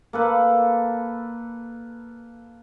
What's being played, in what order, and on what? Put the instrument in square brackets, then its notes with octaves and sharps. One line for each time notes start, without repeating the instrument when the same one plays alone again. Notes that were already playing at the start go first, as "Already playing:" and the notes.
[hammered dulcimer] A#3 A4 B4